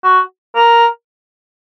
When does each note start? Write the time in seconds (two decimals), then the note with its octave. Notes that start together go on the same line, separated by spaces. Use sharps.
0.04 F#4
0.55 A#4